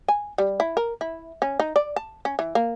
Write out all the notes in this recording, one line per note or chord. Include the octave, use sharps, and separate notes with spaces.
G#5
G3
E4
A#4
E4
C#4
D#4
D5
A5
C#4
E3
A#3